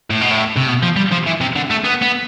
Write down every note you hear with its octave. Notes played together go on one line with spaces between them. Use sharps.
A2
B2
A2
C3
B2
F3
G3
F3
E3
C3
D3
A3
B3
B3